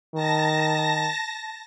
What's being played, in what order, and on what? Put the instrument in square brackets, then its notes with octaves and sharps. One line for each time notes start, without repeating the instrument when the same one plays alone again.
[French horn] D#3 [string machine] A5 A#6